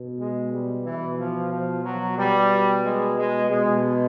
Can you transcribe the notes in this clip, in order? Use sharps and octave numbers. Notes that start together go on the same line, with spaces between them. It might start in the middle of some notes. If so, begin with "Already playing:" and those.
Already playing: B2
G#3
G3
B2 E3
F3
F3
F#3
B2 G3
G#3
G#3
B2 G#3